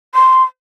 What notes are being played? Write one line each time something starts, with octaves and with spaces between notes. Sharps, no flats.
C6